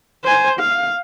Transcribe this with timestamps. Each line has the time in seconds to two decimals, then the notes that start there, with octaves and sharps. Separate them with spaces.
0.24 C5 G#5
0.60 F5